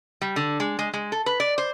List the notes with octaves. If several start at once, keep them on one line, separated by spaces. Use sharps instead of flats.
G3
D3
G#3
G#3
G#3
A4
B4
D5
C5